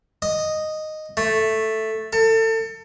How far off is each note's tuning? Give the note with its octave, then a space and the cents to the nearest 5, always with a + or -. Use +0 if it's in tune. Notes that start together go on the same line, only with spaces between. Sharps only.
D#5 -5
A3 +0
A4 +30